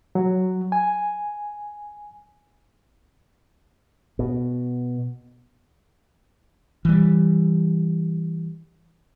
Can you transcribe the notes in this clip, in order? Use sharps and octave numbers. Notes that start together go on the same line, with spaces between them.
F#3
G#5
B2
E3 G3